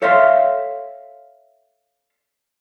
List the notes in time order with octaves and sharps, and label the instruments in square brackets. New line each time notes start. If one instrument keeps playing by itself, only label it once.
[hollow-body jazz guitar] A4 C#5 E5 F5 C6